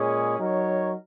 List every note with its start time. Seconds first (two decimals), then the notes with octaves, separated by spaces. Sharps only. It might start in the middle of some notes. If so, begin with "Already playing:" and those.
Already playing: A#2 G#3 C#4 G#4 C#5
0.38 F#3 D#4 A#4 C#5